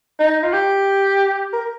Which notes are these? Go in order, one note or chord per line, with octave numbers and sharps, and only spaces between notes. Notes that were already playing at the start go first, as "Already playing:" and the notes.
D#4
F4
G4
A#4